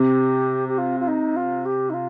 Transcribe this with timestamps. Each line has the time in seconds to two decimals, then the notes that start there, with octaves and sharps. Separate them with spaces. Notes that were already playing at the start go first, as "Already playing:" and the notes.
Already playing: C3 G4
0.68 G4
0.78 F4
1.00 F4
1.07 D#4
1.36 F4
1.65 G4
1.89 D#4
1.93 F4